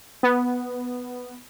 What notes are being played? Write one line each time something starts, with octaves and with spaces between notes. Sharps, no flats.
B3